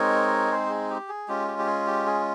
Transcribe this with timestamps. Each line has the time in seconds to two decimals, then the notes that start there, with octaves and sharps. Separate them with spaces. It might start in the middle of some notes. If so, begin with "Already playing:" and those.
Already playing: G#3 C4 D#4 A#4 C#5
0.51 G#4 C5
0.70 G#4
0.90 G4
1.09 G#4
1.28 G#3 C#4 F4 G4
1.48 G4
1.59 G4
1.66 G#4
1.87 G4
2.06 G#4